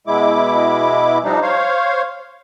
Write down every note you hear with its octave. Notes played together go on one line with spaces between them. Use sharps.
B2 G#3 E4 D6
F3 G3 D4 D#4
C5 C#5 F5